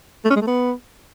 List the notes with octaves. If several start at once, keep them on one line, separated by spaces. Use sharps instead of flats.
A3
C#4
G#3
A3
B3